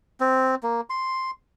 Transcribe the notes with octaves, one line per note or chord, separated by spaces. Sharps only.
C4
A#3
C6